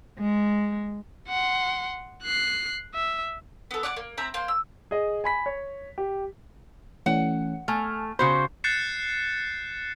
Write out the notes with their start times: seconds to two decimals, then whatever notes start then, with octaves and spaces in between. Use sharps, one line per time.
0.18 G#3
1.28 F#5 C6
2.23 F#6 C7
2.95 E5
3.71 B3 A4
3.83 D5 F#5 G#5 D6
3.96 A#3
4.18 C4 E5 A#5 B5
4.34 A#3 C5 C6
4.48 E6
4.91 G#4 D#5
5.24 G#5 B5 B6
5.46 C#5
5.98 G4
7.06 E3 A3 C#4 F#5
7.68 A3 G#5 A5 F6
8.19 C#3 F#4 C5 B5 G6
8.64 F#6 G6 A6 C7 C#7 E7